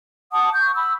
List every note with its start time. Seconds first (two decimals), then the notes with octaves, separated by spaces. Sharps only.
0.32 F#5 A5 D6 D#6
0.53 C#6 G6
0.75 B5 E6